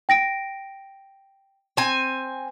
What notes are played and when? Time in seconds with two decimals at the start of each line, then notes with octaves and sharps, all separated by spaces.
0.09 G5 A#6 D7
1.77 C4 G#5